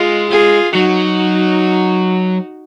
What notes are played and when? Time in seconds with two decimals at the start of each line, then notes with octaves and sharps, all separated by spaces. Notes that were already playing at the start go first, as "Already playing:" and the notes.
Already playing: G#3 F4
0.30 F4 G#4
0.75 F#3 D#4 F#4